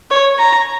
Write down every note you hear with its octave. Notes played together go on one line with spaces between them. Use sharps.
C#5
A#5